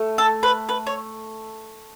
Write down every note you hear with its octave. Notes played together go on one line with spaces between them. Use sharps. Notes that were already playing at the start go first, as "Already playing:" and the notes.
Already playing: A3
A4
B4
B4
C#5